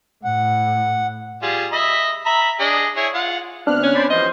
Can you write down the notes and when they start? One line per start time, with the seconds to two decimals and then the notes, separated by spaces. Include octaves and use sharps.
0.25 A2 F#5
1.42 G3 F4 G#4
1.72 D#5 E5 B5
2.26 E5 A#5 B5
2.60 D4 G#4 D#5
2.96 E4 G#4 C#5
3.14 F4 F#5
3.67 D2 B3 C4 D4 F6 F#6
3.83 C#4
3.94 C5 D5 B5
4.10 E3 F3 G3 C5 D#5